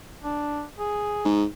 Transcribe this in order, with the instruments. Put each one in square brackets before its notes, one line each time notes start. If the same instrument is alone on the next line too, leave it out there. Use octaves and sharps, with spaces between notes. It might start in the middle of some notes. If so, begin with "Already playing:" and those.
[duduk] D4
G#4
[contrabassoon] G#2